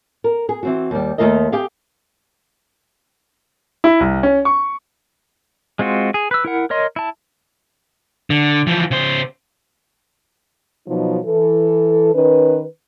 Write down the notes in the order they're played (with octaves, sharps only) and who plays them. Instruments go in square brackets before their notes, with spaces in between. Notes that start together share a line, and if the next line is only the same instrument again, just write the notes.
[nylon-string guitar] A#4
G#4
E3 C4 F#4
D#2 G3
D#2 D#3 A3 F4 A#4 D#5
G4 G#4 F5
[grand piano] E4
C2
C#4
C#6
[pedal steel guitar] G#3 C4 F4 F#4
G#4
B4 E6
E4 A#4 F#5
A#4 C#5 D#5 C6
E4 A5
[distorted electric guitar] D3
E3 F3
C#3 C5
[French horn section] B2 F3 F#3 D#4
E3 A4
D#3 C#4 B4